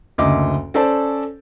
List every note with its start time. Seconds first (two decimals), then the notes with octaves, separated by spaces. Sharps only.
0.18 F#1 D2 D#5 E5 D6
0.74 C#4 A4 C5 D5 A5